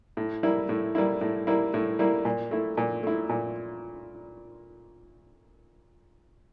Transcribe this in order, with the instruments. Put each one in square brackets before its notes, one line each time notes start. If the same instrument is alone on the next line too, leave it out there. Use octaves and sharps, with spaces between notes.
[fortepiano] A2
G3 A#3 E4
A2
G3 A#3 E4
A2
G3 A#3 E4
A2
G3 A#3 E4
A#2
A3 E4
A#2
A3 E4
A#2